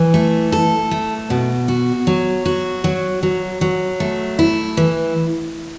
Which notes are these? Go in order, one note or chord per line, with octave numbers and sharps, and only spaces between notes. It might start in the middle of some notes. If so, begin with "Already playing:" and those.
Already playing: E3
A3
A4
A3
B2
F#4
F#3
F#4
F#3
F#3
F#3
A3
E4
E3